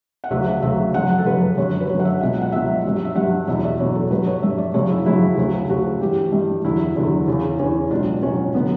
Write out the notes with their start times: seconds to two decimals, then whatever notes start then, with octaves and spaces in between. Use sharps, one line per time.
0.24 F#5
0.30 D2 C#3 F#3 E5
0.62 D2 C#3 F#3 E5
0.94 F#2 C#3 F#3 F#5
1.18 A4
1.26 F#2 C#3 F#3 B4
1.57 F#2 D3 F#3 C#5
1.80 B4
1.89 F#2 D3 F#3 C#5
2.00 F#5
2.05 E5
2.21 C#2 B2 F#3 F#5
2.41 F#5
2.52 C#2 B2 F#3 E5
2.84 G2 F#3
3.05 E5
3.16 G2 F#3 F#5
3.48 E2 B2 F#3 E5
3.64 D5
3.79 E2 B2 F#3 C#5
3.95 A4
4.11 G2 F#3 B4
4.27 C#5
4.42 G2 F#3 E5
4.58 D5
4.74 F#2 C#3 F#3 C#5
4.90 E4
5.05 F#2 C#3 F#3 E4
5.37 D2 C#3 F#3
5.69 D2 C#3 F#3 F#4
6.01 G2 E3 G4
6.32 G2 E3
6.65 E2 D3 F#3 E4
6.96 E2 D3 F#3 D4
7.28 E2 C#3 E3 C#4
7.59 E2 C#3 E3 C#4
7.91 C#2 B2 F#3 D4
8.22 C#2 B2 F#3 C#4
8.55 D3 F#3 B3